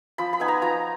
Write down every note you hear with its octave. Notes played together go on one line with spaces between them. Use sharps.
F3 B5
B5
B3 D#4 G#5
A#5
F3 A#5